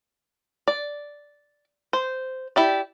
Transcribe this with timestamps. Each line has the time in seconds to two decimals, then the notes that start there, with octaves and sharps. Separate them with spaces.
0.68 D5
1.93 C5
2.56 E4 G4 D5